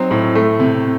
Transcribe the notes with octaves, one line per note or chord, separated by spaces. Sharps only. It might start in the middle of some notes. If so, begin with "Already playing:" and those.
Already playing: F#3 C4 D#4
A2
A3
C3